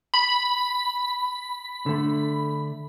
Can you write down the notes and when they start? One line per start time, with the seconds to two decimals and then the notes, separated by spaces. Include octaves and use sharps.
0.14 B5
1.86 D3 A3